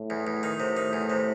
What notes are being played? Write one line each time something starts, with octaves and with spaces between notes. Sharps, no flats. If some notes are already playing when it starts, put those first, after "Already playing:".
Already playing: A2
E2
E2
D#3
A2 C3
D#3
E2
C3